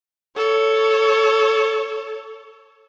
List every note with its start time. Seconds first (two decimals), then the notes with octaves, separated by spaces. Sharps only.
0.36 A4 C#5